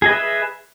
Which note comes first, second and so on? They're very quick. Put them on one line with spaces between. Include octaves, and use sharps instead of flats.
G#4 D#5 B4 E5